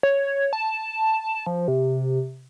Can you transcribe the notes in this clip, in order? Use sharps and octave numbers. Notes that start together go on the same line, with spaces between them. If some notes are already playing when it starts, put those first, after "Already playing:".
C#5
A5
F3
C3